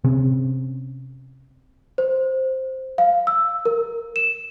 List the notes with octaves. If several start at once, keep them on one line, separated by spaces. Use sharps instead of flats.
C3 C4 C#4
C5
F5
E6
A#4
E7